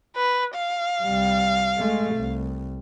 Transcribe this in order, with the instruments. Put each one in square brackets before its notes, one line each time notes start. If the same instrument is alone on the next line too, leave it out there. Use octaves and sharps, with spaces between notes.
[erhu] B4
F5
[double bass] C2 G3
G#3 A3
C2